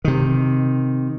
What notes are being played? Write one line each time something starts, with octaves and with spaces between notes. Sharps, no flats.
C3 D#3